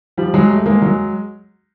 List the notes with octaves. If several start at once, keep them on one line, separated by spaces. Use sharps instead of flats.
F3 G3
F#3 G#3
G3 A3
G#3 A#3
F#3 G#3